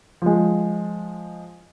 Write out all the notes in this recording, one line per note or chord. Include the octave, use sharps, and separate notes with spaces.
F3 G#3